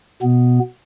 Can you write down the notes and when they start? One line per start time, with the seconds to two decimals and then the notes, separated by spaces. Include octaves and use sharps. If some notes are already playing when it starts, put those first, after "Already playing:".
0.22 B2 B3